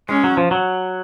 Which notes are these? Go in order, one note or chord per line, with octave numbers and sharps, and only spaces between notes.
G#3 C#4
F#3
F3
F#3